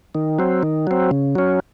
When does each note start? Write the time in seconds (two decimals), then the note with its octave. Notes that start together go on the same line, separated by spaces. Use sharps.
0.15 D#3
0.39 F#3 C4
0.63 D#3
0.87 F#3 C4
1.11 C#3
1.35 F#3 C#4